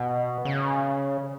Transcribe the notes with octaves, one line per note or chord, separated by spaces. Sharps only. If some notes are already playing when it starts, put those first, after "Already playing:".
Already playing: B2
C#3